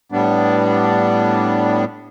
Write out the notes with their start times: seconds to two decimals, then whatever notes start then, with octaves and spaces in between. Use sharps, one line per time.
0.12 A2 G3 B3 D4